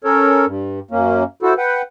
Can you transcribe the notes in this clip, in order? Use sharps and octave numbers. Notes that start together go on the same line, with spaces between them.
C#4 A4 A#4 C#5
G2
F#2 A#3 C#4
E4 F#4 A4 C5
B4 F#5 G5